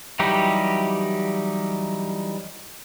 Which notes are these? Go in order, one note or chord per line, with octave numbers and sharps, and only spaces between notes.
E3 F#3 G3 D#4 G4